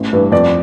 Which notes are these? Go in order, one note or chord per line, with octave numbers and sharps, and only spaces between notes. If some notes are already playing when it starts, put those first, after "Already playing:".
Already playing: A1
G2 E3
F2 D5